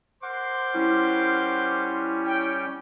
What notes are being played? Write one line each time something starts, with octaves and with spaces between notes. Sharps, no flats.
A#4 C5 F#5 C6 D6
G3 C#4 E4
C#5 G5